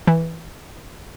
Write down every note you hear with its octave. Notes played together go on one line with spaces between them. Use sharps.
E3